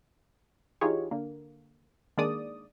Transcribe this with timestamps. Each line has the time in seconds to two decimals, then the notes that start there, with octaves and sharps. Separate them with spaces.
0.81 E3 D#4 F4 G4 G#4 C#5
1.11 D3 A#3
2.18 D#3 G#3 A#3 D4 D5 D#6